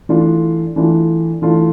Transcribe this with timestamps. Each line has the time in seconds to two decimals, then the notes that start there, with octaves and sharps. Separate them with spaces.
0.09 E3 A3 D4 F4
0.76 E3 A3 D4 F4
1.42 E3 A3 D4 F4